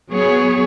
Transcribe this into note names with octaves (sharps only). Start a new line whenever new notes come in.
F#3 B3 G#4 C#5